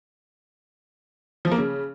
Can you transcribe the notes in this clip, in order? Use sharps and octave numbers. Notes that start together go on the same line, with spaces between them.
F3
A#3
C#3